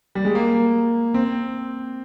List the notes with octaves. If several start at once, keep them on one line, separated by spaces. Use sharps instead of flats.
G3
G#3
A#3
C4